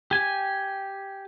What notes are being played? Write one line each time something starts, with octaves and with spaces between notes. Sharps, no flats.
G4 G#5